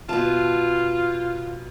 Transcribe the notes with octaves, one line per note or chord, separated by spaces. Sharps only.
B2 F4 A5